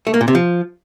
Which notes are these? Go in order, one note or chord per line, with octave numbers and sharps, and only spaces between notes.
A3
A#3
A#2
C3
F3